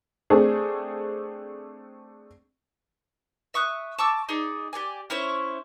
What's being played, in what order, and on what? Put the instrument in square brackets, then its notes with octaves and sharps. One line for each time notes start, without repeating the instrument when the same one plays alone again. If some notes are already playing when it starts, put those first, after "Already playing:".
[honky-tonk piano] A3 C4 D4 G#4
[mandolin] E5 C#6 D#6 F#6
A5 C#6 D6 E6
D#4 G#4 D5
G4 A4 D5 G#5
C#4 E4 C5 C#5